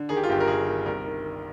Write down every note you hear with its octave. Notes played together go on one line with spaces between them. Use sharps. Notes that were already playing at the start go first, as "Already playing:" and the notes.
Already playing: D3
D#3 G#4
G4
F4
G1 G4
A#4
G1 G#4
D#3
C2 A#4
D#3
D#3